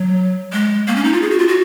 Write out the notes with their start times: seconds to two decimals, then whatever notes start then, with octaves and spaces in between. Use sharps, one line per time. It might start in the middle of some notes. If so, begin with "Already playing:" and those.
Already playing: F#3
0.52 G#3
0.87 A#3
0.96 C#4
1.04 D#4
1.13 F4
1.22 G#4
1.31 F#4
1.39 F4
1.48 F#4